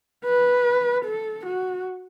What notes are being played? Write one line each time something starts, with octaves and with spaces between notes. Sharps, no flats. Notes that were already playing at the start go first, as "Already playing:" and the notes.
B4
A4
F#4